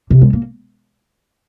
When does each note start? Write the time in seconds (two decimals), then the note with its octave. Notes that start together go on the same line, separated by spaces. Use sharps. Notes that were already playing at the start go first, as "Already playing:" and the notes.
0.10 C3
0.22 G#3
0.33 A#3